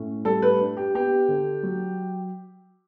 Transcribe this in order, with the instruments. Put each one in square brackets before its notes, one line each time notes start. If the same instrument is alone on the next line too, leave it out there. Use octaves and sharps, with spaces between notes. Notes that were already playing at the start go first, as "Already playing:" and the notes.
Already playing: [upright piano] A2 C#4
G3 A4
B4
D4
G4
B3 G4
D3
F#3